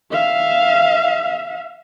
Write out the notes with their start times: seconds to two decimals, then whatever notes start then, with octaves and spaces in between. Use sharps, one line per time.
0.11 E5 F5